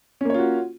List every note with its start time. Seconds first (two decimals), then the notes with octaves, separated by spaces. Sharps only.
0.21 C#4
0.25 A#3
0.30 C#5
0.34 F4
0.39 F#4